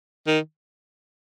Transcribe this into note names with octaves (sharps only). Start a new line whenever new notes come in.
D#3